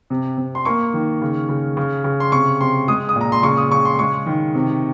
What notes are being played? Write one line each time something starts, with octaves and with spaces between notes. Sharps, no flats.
C3
C3
C6
A#3 C#6
D#3
C#3
C#3
C#3
C#3
C6
C3 C#6
C3 C6
G#3 D#6
D#6
A#2 A#5
C6
C#3 C#6
D#6
C#3 C#6
C6
G#3 C#6
D#3
C3